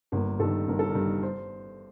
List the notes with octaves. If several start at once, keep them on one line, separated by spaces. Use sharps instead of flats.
G1 A#3
G2 D#3 A4
G1 A#4
A4
A#4
G2
D#3
C5